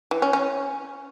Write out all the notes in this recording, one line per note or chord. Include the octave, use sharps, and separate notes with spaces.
E3
C#4
C#4